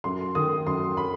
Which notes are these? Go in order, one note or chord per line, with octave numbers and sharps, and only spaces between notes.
F#2 C6
D#3 D#6
F#2 C6
B5